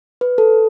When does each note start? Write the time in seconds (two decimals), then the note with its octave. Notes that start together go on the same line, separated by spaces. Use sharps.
0.21 B4
0.38 A4